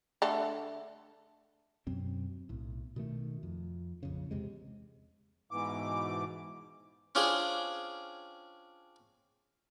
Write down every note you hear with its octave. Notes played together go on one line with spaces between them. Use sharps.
D3 A3 A4
F#2 B2 F#3 C4
B1 A2
B2 D#3 A3
F2
A#1 F2 C#3
E2 C3 G#3
G#2 B2 E3 D6
C#4 D4 F4 G#4 C5 G5